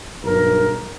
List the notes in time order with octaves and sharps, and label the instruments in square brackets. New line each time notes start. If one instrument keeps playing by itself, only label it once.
[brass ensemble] B1 G2 A#4